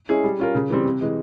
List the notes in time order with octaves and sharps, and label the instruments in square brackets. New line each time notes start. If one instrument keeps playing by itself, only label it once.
[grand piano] G#3 C#4 E4 G#4
G3
C#4 F4 A#4
C#3
E3 G3 C4
C3
E3 G#3